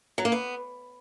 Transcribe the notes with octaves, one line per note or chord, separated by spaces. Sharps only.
F#3
A#3
B3